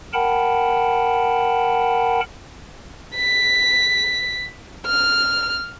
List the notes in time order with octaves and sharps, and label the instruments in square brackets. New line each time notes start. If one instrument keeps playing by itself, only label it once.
[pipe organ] A#4 F#5 G5 A5 B5
[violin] B6
F6